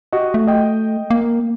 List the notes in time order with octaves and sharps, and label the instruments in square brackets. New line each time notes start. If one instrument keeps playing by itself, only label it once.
[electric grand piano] F#4 G4 D#5
[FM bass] A3
[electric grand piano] D#5 G5
[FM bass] A#3